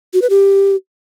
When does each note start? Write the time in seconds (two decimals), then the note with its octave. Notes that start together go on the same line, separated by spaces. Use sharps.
0.14 F#4
0.22 B4
0.30 G4